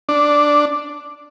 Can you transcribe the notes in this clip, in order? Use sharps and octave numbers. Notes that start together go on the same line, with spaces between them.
D4